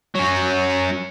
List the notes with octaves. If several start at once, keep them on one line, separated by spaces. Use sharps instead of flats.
F#3 C#4